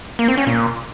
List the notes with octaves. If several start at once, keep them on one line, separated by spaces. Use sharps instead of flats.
A#3
C4
C#4
A#2